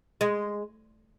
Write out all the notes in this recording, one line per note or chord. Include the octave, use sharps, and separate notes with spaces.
G#3